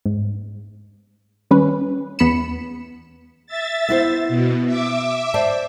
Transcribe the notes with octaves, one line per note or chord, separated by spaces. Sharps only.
G#2
D#3 G3 C#4 B4
E2 B3 B5 B6 C#7 E7
E5 A6
B3 E4 C5
B2
E5 D6
C5 D5 A5